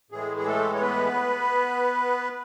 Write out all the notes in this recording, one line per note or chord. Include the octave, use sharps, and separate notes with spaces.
A2 E3 G#3 G#4
G#4
A3 A4
C#5
B3 B4